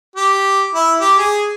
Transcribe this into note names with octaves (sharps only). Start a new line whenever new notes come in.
G4
E4
G4
G#4